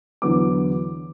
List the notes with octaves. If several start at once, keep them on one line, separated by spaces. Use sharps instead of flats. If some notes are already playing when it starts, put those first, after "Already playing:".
E2 D3 F#3 B3 D6